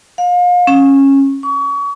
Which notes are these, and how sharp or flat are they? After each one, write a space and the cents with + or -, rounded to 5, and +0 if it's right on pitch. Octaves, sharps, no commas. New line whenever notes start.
F5 +35
C#4 -15
C#6 +35